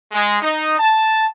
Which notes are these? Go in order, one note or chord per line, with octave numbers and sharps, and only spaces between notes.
G#3
D#4
A5